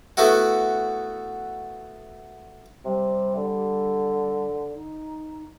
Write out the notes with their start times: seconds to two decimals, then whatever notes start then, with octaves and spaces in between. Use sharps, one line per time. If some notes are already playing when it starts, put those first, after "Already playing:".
0.17 A3 B3 E4 F#4
2.85 C3 G3
3.36 D3
4.74 D#4